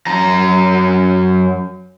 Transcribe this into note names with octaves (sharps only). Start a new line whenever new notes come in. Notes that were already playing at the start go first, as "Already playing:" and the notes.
F#2 A#5